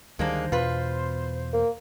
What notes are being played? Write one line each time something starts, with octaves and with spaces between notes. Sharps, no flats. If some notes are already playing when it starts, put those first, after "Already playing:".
D2 D#3 G3 G#3 A#3 D4 C5
E2 B2 F4 B4
A#3